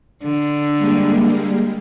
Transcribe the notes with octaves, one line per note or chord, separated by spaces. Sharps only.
D3
G3 G#3 A#3